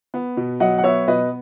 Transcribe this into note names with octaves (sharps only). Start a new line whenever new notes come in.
B3
B2
F#3 D#5 F#5
F#5
B3 C#5 E5
B2 B4 D#5